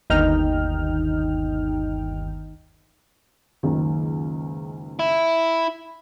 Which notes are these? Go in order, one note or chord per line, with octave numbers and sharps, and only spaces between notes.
G1 D#2 D#4 G5 F6
F#1 C#2 D#3
E4